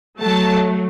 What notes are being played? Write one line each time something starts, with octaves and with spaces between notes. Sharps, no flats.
F#3 A3 A5